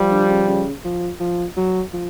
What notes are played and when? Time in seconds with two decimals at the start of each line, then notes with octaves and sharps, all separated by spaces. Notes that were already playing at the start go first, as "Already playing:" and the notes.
Already playing: F3 G3
0.12 D3
0.30 C#3
0.48 C#3
0.85 F3
1.20 F3
1.57 F#3
1.93 F3